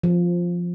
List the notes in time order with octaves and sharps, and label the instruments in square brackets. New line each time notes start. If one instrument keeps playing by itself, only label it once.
[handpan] F3